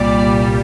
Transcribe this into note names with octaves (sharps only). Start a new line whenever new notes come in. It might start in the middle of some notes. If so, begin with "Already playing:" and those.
Already playing: C2 A#2 G3 D5